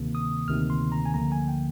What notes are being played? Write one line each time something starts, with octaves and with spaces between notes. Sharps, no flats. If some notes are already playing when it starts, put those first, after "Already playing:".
Already playing: D2 C3 D#3 A#3
D#6
D2 C3 D#3 A#3 F6
C6
A#5
G#5
D2 D3 F3 A#3 A#5
G#5
G5